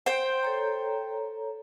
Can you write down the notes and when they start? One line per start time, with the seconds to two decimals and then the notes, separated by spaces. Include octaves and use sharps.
0.06 C5 G5
0.43 A4 C#5 A#5